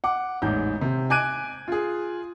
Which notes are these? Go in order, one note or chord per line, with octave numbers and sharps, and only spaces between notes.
F#5 D6
A1 E2 G#2 G6
C3
G#5 D6 F#6 G#6 D7 D#7
F4 G#4